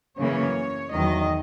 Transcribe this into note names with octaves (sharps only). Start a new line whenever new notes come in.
F#2 C#3 E3 A#3 C#5
E2 D#3 F#3 D#5